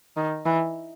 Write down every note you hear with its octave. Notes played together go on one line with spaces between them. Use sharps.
D#3
E3